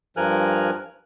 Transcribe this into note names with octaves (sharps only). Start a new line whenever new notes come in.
G2 F3 A#4 G#5 F6 F#6